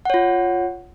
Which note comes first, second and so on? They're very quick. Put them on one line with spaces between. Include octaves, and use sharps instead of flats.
F#5 C#5 F4